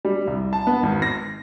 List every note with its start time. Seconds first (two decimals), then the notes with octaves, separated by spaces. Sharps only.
0.05 G3
0.27 C2
0.53 A5
0.67 B3
0.83 G#1
1.02 A#6